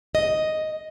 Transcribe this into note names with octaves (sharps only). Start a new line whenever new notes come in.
D#5